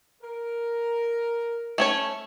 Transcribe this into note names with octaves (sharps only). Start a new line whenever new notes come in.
A#4
A3 C#4 C#5